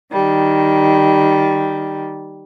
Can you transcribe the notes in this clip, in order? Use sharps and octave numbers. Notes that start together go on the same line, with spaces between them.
D#3 G3